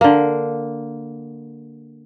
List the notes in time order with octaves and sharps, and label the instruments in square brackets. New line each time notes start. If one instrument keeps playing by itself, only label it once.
[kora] D3 A#3